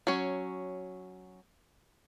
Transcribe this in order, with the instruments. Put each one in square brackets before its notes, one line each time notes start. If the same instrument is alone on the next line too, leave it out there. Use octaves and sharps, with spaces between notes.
[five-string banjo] F#3 C#4